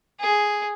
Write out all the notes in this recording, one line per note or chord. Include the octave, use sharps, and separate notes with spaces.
G#4